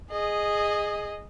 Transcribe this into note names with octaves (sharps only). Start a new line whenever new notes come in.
G#4 D#5